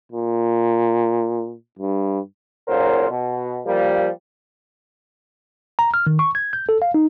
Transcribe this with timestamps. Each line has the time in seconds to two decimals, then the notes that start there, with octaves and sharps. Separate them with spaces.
0.12 A#2
1.79 G2
2.68 B1 A#2 C#3 F#3 A#4 C5
3.09 B2
3.65 F3 G3 A#3
5.79 A#5
5.94 F6
6.07 D#3
6.19 C#6
6.35 G#6
6.53 G6
6.69 A4
6.82 F5
6.94 D#4